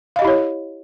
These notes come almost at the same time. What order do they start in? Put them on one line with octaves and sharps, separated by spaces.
F5 D#5 G4 E4 C#5